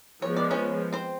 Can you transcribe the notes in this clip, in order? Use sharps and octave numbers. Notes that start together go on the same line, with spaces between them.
F3 G#3 B3 C#5
D5
C#4 C#5
C4 C5